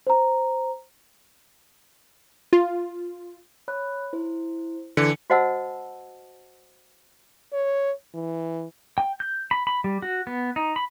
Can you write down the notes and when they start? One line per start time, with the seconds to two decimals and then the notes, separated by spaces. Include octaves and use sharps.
0.07 C5 A#5
2.53 F4
3.68 C#5 B5 F#6
4.13 E4 C5
4.97 D3 E3 C#7
5.30 F#4 C5 D#5 F#5 A5 E6
7.53 C#5
8.14 E3
8.98 G5
9.20 G6
9.51 B5
9.67 B5
9.84 G3
10.02 F#4
10.27 B3
10.56 D#4
10.76 B5